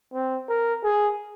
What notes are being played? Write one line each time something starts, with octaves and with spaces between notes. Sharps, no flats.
C4
A#4
G#4